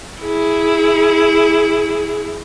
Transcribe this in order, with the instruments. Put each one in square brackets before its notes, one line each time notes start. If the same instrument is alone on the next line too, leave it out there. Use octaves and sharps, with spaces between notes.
[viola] E4 G#4